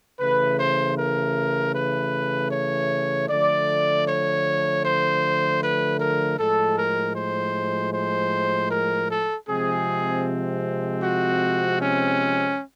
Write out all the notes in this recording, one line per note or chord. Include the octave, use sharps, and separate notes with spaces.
C#3 E3 A3 B4
C5
A#4
B4
C#5
D3 F3 A3 D5
C#5
C5
B4
A#4
A2 F3 G#3 A4
A#4
C5
C5
A#4
A4
C3 F3 G#3 C4 G#4
F#4
C#4